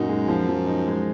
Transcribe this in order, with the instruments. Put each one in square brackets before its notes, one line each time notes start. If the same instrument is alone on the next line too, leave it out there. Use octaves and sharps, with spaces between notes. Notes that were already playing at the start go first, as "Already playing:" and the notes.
Already playing: [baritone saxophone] F#2 [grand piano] A#2 D#4 F#4
[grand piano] G#3
F3
F3
D#4
G#3